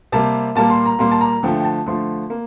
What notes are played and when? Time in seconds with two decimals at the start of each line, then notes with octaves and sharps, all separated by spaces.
0.12 C3 G3 A#3 A5
0.55 A#2 G3 A#3 A5
0.70 C6
0.86 A#5
0.99 A#2 G3 A#3 C6
1.11 A5
1.21 A#5
1.43 D3 F3 A3 G5
1.60 G5
1.64 A5
1.86 D3 F3 A3 C6
2.30 A#3